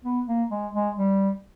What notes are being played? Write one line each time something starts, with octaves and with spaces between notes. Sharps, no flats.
B3
A#3
G#3
G#3
G3